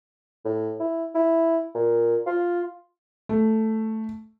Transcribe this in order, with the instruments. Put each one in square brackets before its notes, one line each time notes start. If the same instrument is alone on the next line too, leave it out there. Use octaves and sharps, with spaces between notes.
[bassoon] A2
E4
E4
A#2
F4
[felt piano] A3